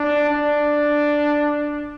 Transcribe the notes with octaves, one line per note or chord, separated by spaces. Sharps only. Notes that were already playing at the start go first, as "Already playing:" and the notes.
Already playing: D4
D4